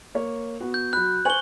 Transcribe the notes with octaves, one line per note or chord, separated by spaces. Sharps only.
A#3 C#5
B3 F#4
G6
F#3 B5 F#6
C5 G#5 C#6 F#7 G7